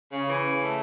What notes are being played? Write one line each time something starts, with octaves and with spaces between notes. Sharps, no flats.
C#3
E3
C#3
A3